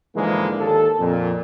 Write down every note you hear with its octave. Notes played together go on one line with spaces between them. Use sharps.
G#2 D3 E3 F3 G#3 A#3
D#2 A4
F2 A#2